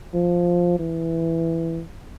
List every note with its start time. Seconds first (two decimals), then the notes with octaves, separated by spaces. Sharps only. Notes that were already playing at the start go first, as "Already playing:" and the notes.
0.14 F3
0.79 E3